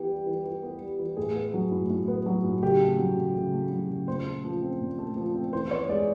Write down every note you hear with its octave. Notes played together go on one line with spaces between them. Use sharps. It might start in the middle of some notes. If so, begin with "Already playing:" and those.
Already playing: E3 B3 G4
G3
E3
E3
B3
G3
E3
A2 G#4
B3
F#3
A2
A2
B3
F#3
A2
C#3 G4
A3
F#3
C#3
C#3
A3
F#3
C#3
A#2 C5
A3
F3
C4
A#2
A3
F3
C4
E3 C5
B3 C#5
G#3 D5